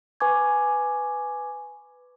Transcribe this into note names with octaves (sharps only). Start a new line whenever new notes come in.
B4 G#5 C#6 D6 G#6